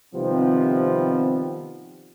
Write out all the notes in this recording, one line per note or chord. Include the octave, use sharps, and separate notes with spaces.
C3 D#3 F3 G3 B3 C4